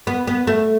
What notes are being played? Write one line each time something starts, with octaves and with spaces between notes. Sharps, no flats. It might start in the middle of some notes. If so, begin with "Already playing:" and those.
B3
B3
A3